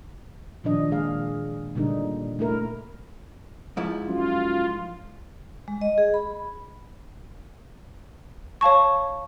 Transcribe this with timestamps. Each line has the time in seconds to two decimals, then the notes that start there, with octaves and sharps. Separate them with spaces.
0.64 A#2 D#3 F3 D4 D#5
0.91 G#3 G#4 F5
1.75 A#2 D3 G3 D4 D#4
2.39 A3 E4 A#4
3.77 G#2 F3 E4
4.08 F#2 F4
5.68 G#3
5.81 D#5
5.98 G#4
6.14 B5
8.61 C#5 F5 A5 C#6